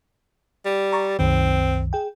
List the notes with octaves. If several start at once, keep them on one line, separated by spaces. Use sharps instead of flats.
G3
A#5 C#6 A6
C2 F#2 D#3 C4
G#4 G5